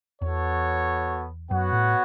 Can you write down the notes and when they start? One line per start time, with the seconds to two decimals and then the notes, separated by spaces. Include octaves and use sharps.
0.22 E2 B3 F#4 A4 C#5
1.51 F#2 B3 F#4 C#5 F#5
1.73 A2